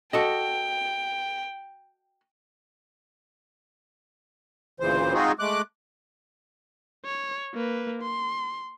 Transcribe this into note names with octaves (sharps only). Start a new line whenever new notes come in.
F#4 A4 D#5 G5
D2 A#2 C#3 E3 C5
G#3 C4 D#4 F4 F#4 G#4
G#3 A3 D6 F#6
C#5
A#3 B4
C6